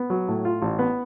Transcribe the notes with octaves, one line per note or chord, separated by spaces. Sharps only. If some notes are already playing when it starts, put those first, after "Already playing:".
Already playing: B3
F#3
A2
F4
A1
B3